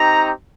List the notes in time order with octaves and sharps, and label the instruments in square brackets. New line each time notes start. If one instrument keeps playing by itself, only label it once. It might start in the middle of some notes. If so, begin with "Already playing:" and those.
Already playing: [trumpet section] C4 D#4 G4 A#5